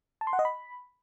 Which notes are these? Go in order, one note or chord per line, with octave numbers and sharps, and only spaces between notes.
A5
C6
F#5
D#5
B5